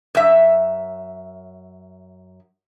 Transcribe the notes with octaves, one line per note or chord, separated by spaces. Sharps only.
F#2 E5